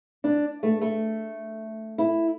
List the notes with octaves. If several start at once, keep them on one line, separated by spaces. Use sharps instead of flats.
D4
A3
A3
E4